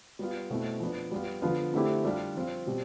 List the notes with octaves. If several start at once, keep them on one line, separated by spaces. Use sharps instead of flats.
G3 B3 F4
B2 A3 C4 E4
F3 B3 D4
G3 B3 F4
D3 F3 B3 F4
D3 A3 C4 E4 G4
G3 D4 F4
F3 C4 F4
B2 G3 C4 G4